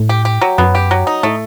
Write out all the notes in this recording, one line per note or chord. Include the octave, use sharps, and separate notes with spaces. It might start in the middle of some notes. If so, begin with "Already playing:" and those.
Already playing: A2
G4
G4
F#3
F#2 B3
G4
F#3
D#4
A2 A3